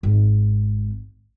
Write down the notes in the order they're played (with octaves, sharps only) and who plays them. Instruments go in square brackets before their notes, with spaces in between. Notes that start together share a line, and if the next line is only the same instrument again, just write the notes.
[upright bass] G#1